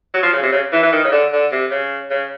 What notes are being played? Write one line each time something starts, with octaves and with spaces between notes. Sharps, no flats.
F#3
F3
C#3
C3
C#3
E3
E3
D#3
C#3
D3
D3
C3
C#3
C#3